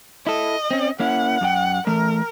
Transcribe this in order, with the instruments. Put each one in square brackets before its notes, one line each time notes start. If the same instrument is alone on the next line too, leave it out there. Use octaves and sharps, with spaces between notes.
[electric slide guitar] E4 A4 [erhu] D#5
[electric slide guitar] C4 C#4
[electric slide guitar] A#3 C#4 E4 [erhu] F#5
[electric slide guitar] F#2 G4 G5
[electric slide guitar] E3 A3 [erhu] A#4